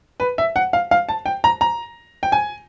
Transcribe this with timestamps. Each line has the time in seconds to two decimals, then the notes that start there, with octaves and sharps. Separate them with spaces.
0.20 B4
0.38 E5
0.56 F#5
0.73 F5
0.91 F5
1.09 A5
1.26 G5
1.44 A#5
1.61 A#5
2.23 G5
2.32 G#5